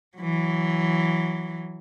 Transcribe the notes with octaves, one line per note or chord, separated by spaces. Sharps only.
E3 F#3